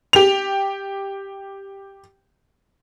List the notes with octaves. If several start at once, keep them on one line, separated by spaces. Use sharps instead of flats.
G4 F7